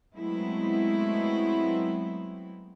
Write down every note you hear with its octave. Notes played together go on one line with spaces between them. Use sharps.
F#3 G#3 A3 B3 C4 E4